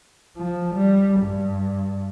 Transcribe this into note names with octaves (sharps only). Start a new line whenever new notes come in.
F3
G3
G2